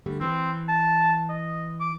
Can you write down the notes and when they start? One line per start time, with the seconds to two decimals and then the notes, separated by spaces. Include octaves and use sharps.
0.06 D3 G3 A3
0.21 E3 C4
0.69 A5
1.29 D#5
1.80 D6